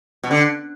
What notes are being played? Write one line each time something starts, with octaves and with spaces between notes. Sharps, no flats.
B2
D3